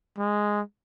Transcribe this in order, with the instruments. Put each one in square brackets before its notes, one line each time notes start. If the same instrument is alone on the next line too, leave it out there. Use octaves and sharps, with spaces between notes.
[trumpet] G#3